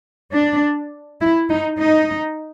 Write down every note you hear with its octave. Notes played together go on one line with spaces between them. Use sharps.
D4
E4
D#4
D#4